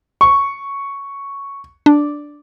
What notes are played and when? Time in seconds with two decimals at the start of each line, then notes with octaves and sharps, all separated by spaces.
0.21 C#6
1.86 D4